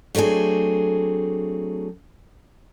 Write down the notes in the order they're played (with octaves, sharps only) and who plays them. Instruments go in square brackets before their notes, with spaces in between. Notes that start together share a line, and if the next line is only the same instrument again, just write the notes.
[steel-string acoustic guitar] F#3 A3 C4 D4 G#4